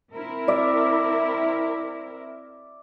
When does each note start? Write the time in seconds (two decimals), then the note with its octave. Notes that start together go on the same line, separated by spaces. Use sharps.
0.13 C4 E4 A#4
0.48 D5 E5